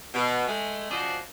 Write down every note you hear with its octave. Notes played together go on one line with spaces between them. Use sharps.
B2
G#3 A3
C#3 F3 F#4 C5 D5 D#5